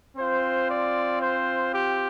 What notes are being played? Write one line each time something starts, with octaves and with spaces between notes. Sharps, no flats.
C4 F4 C5
D5
C5
G4